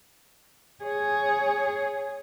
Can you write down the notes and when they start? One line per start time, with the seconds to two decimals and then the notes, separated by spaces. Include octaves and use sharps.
0.84 G#4 C#5